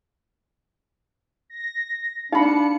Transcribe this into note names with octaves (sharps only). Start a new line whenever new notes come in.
A#6
D4 D#4 F5 B5 C#7